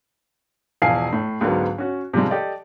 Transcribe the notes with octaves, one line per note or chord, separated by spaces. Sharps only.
E1 E3 F3 F5 G#5 C7
A2
C#2 G#2 D3 F#3 B3
C#4 F#4
C3 F3 G3 G#3
G4 A4 D5 D#5